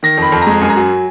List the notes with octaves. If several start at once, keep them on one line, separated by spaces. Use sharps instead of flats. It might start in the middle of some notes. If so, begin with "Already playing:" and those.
D#3 A#6
F2 B5
F2
G#3 A#5
F#2 G#5
A#5
F#3 G#5